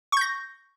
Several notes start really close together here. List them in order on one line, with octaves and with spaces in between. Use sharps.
C#6 G6 A#6